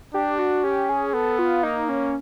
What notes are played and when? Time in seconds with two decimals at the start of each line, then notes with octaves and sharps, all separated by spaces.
0.14 D4 G4
0.39 F#4
0.64 C#4 G4
0.89 G#4
1.14 B3 A4
1.39 F4
1.63 A#3 D#4
1.89 C#4